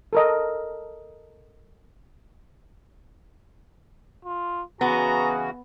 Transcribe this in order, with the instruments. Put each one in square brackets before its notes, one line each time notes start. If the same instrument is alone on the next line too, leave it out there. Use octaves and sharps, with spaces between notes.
[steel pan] A4 A#4 D#5
[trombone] F4
[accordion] C#3 E3 F#4 [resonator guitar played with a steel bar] B3 [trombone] G#4 [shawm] A#5